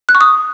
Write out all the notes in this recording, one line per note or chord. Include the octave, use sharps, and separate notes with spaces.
F#6
C#6
D#6